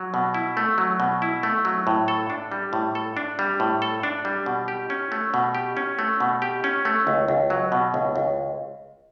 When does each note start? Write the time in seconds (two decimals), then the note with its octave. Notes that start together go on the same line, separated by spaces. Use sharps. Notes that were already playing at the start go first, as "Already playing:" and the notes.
Already playing: F#3
0.14 B2
0.34 E4
0.57 A3
0.78 F#3
1.00 B2
1.22 E4
1.43 A3
1.65 F#3
1.87 A2
2.08 A4
2.30 D4
2.52 G3
2.73 A2
2.95 A4
3.17 D4
3.39 G3
3.60 A2
3.82 A4
4.03 D4
4.25 G3
4.46 B2
4.68 G4
4.90 C#4
5.12 A3
5.34 B2
5.55 G4
5.77 C#4
5.99 A3
6.20 B2
6.42 G4
6.64 C#4
6.85 A3
7.07 C#2
7.28 C#2
7.50 F#3
7.72 B2
7.94 C#2
8.16 C#2